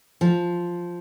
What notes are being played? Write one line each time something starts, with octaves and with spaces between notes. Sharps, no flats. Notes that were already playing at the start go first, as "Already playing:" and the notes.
F3